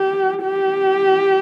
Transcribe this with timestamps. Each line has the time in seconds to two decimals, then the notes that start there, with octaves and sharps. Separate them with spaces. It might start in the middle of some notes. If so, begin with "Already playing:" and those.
Already playing: G4
0.43 G4